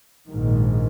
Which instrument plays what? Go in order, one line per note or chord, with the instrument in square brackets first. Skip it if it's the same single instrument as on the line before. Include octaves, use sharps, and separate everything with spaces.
[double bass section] A#1 G#2 D#3